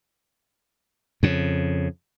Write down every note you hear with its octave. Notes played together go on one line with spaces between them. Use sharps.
F2 C#3